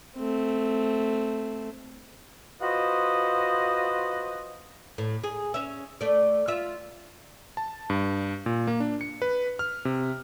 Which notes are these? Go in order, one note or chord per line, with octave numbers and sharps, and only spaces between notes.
A3 C4
F4 F#4 B4 C5 D#5
A2
G#4
C#4 E5
A3 D5
F4 E5
A5
G2
A#2
A#3
D4
C#7
B4
F6
C3